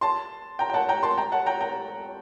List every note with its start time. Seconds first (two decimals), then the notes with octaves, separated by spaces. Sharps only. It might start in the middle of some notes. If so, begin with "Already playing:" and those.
0.01 A5 C6
0.59 G5 A#5
0.70 G5
0.74 F#5 A5
0.89 G5 A#5
1.03 A5 C6
1.18 G5 A#5
1.32 F#5 A5
1.46 G5 A#5
1.60 G5 A#5